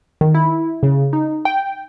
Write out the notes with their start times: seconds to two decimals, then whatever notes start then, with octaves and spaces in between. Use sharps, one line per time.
0.21 D#3
0.35 E4
0.83 C#3
1.13 D#4
1.45 G5